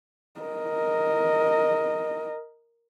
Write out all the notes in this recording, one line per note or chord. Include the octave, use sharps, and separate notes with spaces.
A#4 D#5